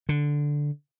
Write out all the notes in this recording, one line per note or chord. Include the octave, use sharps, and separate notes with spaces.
D3